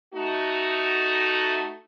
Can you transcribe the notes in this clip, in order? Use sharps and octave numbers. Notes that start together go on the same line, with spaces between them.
A3 D#4 F#4